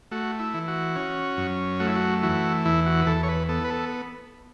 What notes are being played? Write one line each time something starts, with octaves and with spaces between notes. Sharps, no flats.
A3 F#4
E4
E3
F#4
C#4
F#2
A3 F#4
E4
F#4
E3 F#4
E2 E4
F#4
B4
E2 A4
C#5
B4
B3 A4
B4
A4